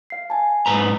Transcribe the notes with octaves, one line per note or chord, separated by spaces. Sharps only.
F5 C7
G#5 A5
G#2 B4 A#5 B6